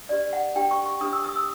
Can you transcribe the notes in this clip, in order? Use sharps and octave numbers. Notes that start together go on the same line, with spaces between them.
D4 G4 B4 D5
F#5
D4 G4 B4 G5
C#6
C#6
D4 G4 B4 D#6
E6
D#6
E6